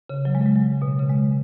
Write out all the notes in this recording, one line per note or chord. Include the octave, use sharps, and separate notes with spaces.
C#3
F#3
G#3
F#3
G#3
F#3
C#3
B2
C#3
C#3
G#3